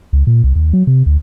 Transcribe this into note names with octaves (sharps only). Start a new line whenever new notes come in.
C#2
A#2
C2
D#2
F#3
C3
D2